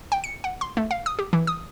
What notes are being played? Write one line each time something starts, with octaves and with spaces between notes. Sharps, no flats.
G5
C#7
F#5
C6
A3
F5
D#6
G4
E3
D#6